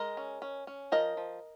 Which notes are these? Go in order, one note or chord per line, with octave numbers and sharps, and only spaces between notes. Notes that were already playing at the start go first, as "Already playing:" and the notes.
Already playing: G#3 A#4 D#5
C#4
C#4
C#4
F3 A#4 D#5
F3